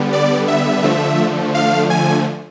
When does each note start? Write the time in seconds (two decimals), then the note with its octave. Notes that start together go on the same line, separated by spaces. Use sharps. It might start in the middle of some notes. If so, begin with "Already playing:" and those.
Already playing: D3 G3 B3
0.13 D5
0.48 E5
0.83 D3 F3 A3
1.54 F5
1.90 G#5